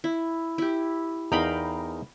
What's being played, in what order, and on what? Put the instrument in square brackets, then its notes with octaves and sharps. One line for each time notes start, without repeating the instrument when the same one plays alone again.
[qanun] E4
E4 G4
[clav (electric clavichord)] E2 D#4 A#4 [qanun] F5 G5 B5